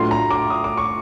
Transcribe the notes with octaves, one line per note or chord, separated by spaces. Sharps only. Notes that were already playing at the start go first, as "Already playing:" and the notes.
Already playing: A2 F#3 A3 D4 F4 C6
A#5
D6
D#6
D6
C#6